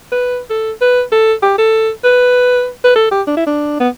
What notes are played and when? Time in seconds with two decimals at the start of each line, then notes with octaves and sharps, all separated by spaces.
0.12 B4
0.50 A4
0.81 B4
1.12 A4
1.43 G4
1.58 A4
2.04 B4
2.84 B4
2.96 A4
3.11 G4
3.27 D4
3.37 E4
3.47 D4
3.80 B3